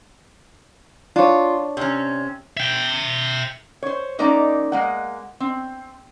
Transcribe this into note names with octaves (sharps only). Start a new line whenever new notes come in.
D4 F4 C#5
C3 C#4
E5 G5
C5 C#5
G#3 A#3 C#4 D#4 D5 A#5
G#3 A#3 F#5
C4